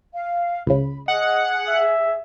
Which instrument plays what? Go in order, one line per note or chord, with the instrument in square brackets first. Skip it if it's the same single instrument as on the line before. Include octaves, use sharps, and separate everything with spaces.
[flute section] F5
[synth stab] C#2 C#3 [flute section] B5
[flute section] G#4 [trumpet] D#5 [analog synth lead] F#5
[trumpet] E5